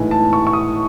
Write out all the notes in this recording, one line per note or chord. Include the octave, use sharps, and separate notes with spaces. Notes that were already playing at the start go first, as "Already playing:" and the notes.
Already playing: A2 E3 G#3 B3 D#4 G#5
A5
C#6
C#6
D#6